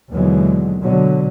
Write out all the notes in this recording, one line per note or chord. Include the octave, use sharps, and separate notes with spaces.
D#2 B2 D3 E3 F#3 G#3
B2 D3 F#3